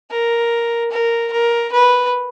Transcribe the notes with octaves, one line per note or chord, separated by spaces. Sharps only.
A#4
A#4
A#4
B4